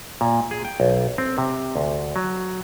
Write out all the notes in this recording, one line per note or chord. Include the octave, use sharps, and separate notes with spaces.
A#2
G#4
G5
B1
C4
C3
D2
F#3